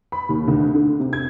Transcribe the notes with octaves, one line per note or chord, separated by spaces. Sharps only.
B5
D#2
D2
D3
C3
G#6